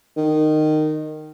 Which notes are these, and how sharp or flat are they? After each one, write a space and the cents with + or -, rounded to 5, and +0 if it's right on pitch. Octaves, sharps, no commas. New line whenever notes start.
D#3 -15